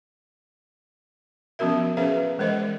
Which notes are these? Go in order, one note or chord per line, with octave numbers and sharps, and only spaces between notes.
F3 B3 C#4 F#4 A#4 E5
C#4 G#4 B4 C5 E5 F5
E3 G#3 A#4 C5 D#5